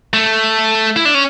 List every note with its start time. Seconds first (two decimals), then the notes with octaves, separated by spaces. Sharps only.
0.13 A3
0.96 E4
1.05 D4
1.14 C#4